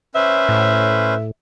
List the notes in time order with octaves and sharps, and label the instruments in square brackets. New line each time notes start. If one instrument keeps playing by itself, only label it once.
[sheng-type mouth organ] C#4 B4 C5 [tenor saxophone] E5
[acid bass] A2